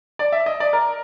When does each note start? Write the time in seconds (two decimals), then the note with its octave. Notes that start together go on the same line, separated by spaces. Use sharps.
0.19 D5
0.32 E5
0.46 D#5
0.60 D5
0.73 A#4